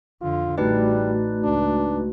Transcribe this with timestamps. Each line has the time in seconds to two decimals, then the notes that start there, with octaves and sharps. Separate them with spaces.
0.22 F2 D3 F4
0.58 A1 G3 A3 D#4 F#4 B4 D5
1.44 C#2 D4